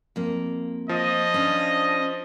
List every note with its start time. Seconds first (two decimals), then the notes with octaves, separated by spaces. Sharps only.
0.16 F2 A#3
0.89 F3 D#5
1.34 C#4 D4